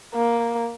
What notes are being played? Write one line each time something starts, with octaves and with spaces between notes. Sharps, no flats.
A#3